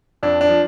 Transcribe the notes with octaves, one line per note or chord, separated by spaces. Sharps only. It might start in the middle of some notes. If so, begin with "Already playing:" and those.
F2 D4
D4
F3